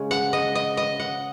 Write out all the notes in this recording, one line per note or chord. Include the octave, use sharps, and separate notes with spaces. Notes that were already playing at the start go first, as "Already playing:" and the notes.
Already playing: C#3 G#3 C#4
F#5
D#5
D#5
D#5
F#5